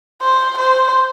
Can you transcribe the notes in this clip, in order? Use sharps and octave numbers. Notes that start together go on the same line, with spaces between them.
C5
C5